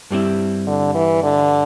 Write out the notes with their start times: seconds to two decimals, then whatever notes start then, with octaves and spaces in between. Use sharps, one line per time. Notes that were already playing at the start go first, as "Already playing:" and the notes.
0.11 G2 G3 C4 E4
0.67 D3
0.95 E3
1.23 D3